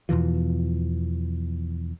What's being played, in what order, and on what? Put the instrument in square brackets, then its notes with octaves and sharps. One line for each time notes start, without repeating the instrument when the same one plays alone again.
[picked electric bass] E2 B2 E3 F3